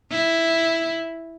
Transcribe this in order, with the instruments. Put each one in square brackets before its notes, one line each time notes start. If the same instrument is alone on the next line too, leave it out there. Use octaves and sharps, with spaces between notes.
[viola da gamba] E4